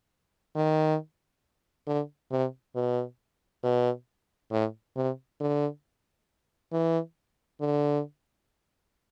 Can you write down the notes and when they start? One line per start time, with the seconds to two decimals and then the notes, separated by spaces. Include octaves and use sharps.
0.55 D#3
1.87 D3
2.31 C3
2.75 B2
3.63 B2
4.51 A2
4.97 C3
5.40 D3
6.72 E3
7.61 D3